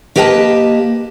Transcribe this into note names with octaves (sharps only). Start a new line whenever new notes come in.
A#3 G4 B4 D#5 G5 A5